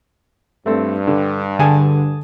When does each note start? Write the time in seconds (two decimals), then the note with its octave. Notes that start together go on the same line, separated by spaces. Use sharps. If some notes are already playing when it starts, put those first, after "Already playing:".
0.66 G2 A3 C4 A4
1.08 D3
1.59 D3 G#4 G#5 A5